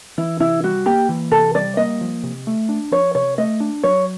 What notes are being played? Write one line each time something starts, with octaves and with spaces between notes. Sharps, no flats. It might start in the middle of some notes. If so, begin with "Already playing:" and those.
E3 E4
C3 E4
G3 F#4
A#3 G4
E3
C3 A4
G3 D5
A#3 D#5
F3
C3
A3
D4
F3 C#5
C3 C#5
A3 D#5
D4
F#3 C#5